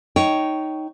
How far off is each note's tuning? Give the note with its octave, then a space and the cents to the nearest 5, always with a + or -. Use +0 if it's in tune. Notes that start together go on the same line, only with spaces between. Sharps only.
D#4 +5 C#5 +5 G5 -15